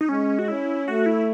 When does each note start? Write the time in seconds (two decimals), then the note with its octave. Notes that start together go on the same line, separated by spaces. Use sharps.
0.01 D#4
0.09 G#3 C#4
0.39 F#4
0.48 C#4 E4
0.88 A3 F#4
1.06 E4